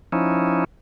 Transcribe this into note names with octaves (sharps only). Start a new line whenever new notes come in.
F3 C#4 D#4 E4